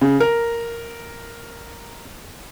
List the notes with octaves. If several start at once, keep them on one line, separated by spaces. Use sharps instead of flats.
C#3
A#4